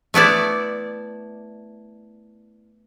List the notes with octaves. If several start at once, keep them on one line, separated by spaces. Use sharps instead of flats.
A3 B3 E4 D5